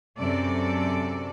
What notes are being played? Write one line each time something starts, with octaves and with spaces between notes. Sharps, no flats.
F#2 C3 A4 D5